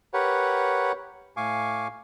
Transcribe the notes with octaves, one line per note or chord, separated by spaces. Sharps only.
G4 A#4 B4 C#5 F#5
A2 F5 G#5 C#6 D6